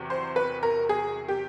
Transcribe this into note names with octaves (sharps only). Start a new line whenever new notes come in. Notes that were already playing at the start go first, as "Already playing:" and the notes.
Already playing: E2 C3 F#3
C5
B4
A#4
G#4
G4